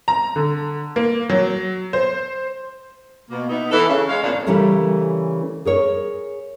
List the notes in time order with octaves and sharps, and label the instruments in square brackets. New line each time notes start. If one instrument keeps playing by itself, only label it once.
[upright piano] A#5
D3
A#3
F#3
C5
[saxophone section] B2 A#3
B3 D#4 E4
E3 A4
C#3
G#3 C#5 F5
F2 A2 C#3 A#3 D4 A#4
[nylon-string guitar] C#3 E3 G3 A3 C#4 A#4
G#4 A#4 C#5